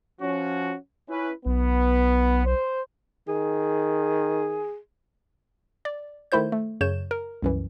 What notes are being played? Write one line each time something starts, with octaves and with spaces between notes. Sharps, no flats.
F3 C#4 F#4
C#4 E4 B4
B1 B3
C5
D#3 G#4
D5
D#3 A3 E4 C5 G6
A3
F#2 C#3 C#5 G6 E7
A#4
C2 F#2 E3